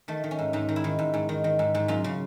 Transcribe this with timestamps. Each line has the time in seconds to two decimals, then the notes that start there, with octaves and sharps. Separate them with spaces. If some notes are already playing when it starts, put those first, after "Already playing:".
0.08 D#3 A3
0.24 D#3
0.31 C#4
0.39 G#2
0.53 G#2 D#4
0.69 D#3
0.76 E4
0.84 D#3
0.99 G#2
1.14 G#2
1.29 D#3
1.44 D#3
1.59 G#2
1.74 G#2
1.88 F#2 F4
2.04 C#3